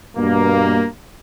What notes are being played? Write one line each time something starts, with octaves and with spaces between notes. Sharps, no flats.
G2 B2 A#3